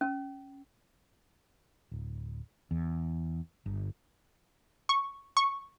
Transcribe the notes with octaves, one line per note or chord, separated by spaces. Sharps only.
C#4
D1
E2
G1
C#6
C#6